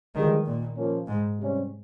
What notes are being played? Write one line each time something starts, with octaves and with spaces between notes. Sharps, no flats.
G2 D#3 F3 G#3
A#2
A#2 F3 A#3 C#4
G#2
C3 G3 C#4